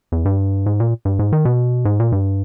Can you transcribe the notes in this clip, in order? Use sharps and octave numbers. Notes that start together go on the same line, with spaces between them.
E2
G2
G#2
A#2
G2
G#2
D#3
B2
G#2
A#2
G2